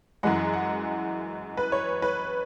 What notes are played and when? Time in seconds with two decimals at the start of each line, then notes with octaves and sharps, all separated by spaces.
0.23 F#2 E3 G#3 F#5
0.54 F#5
1.57 B4
1.72 C#5
2.02 B4